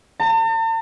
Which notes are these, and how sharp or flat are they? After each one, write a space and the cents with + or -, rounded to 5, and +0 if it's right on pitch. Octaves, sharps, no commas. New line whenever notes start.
A5 +45